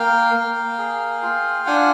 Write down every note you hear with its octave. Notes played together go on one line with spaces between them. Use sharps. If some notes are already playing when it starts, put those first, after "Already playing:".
Already playing: A#3 F5 G5
A#3
G#4
F4
D4 F#5 G#5